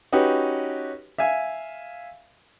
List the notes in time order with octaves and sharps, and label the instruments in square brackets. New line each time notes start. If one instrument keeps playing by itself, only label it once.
[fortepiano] C#4 D#4 F#4 G4 B4
E5 F5 G#5